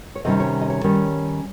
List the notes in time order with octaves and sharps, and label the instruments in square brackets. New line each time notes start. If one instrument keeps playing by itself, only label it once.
[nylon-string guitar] C#5
C3 D#3 G3 C#4 D#5
C#5
D#5
C#5
D#3 G3 C#4